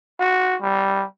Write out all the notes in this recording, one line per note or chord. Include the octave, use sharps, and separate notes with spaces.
F#4
G3